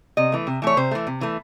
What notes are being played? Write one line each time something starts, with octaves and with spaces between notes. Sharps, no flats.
C3 D#5
E3 A3
C3
E3 A3 C#5
C3 C5
E3 A3
C3
E3 A3